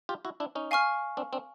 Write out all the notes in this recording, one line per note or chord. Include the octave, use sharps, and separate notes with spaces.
F4 G4
E4 F#4
D4 E4
C#4 D#4
F5 G#5 C#6 F6
C4 D4
C4 D4